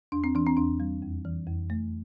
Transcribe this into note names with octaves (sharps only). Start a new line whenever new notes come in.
E2 D4
C4
E3 D4
C4
E2 D4
G3
F2
E3
F2
A3